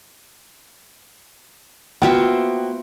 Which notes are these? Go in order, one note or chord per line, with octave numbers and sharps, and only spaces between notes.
A#3 B3 F4 F#4 C5 E5 G5